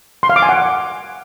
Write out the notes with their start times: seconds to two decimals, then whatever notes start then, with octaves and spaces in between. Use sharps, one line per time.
0.23 C6
0.30 F5
0.36 D6
0.42 G#5
0.49 F#5